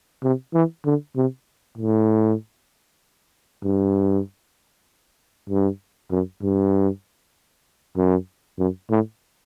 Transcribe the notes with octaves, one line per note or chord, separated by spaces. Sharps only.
C3
E3
D3
C3
A2
G2
G2
F#2
G2
F#2
F#2
A2